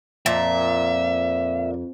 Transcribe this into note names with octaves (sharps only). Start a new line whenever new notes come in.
F2 A#2 E5